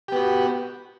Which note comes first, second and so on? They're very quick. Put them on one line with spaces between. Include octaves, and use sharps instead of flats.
G4 B3 F#4